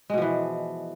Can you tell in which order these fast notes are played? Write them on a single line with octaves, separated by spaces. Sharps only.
G#3 B2 F3 E3